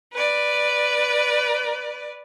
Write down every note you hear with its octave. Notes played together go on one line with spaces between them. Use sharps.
B4 D5